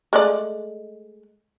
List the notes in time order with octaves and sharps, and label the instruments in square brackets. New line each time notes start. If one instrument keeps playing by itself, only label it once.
[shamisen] G#3 A3 D5